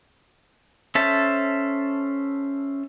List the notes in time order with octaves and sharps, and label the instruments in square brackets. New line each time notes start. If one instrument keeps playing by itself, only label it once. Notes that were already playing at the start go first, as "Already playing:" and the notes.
[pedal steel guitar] C#4 A4 C5 E5 A5